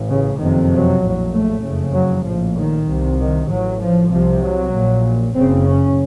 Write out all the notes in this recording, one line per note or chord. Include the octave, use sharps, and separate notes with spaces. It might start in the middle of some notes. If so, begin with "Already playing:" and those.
Already playing: A1 A2
C#3
F#1 F2 C3 D#3
F#3
A#1 A2
A3
F#1 F2 C#3
F#3
A#1 A2 F3
D#3
C2 C3
D#3
A1 A2 F#3
F3
C2 C3 F3
F#3
A#1 A#2
F#1 F#2 C#3 C4
C#4